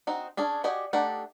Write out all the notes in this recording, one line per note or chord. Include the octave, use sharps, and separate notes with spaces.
C4 D#4 F#4
C#4 D4 G#4
F#4 G4 D5 D#5 G#5
A3 D4 D#4 G4 F#5